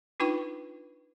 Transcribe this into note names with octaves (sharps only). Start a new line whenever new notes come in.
D4 D#4 F4 B4 G5 C#6